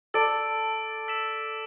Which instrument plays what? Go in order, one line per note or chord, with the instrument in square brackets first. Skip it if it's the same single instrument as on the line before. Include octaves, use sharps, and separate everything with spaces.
[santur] A4 D5 [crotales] E6 A6 D7
[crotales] E6 B6 E7